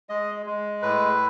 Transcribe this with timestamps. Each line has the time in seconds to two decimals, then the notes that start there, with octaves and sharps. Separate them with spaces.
0.09 G#3 D#5
0.46 G#3
0.82 A2 B4